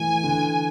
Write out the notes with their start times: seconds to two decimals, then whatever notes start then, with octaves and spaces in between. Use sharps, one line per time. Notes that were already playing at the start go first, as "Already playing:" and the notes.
Already playing: E3 A3 G#5
0.24 D3